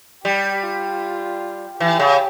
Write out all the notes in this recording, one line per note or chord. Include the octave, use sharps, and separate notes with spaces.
G3 G4
F4
E3 G4
C#3